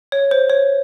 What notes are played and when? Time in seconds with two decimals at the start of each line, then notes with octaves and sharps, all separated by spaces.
0.12 C#5
0.31 C5
0.50 C#5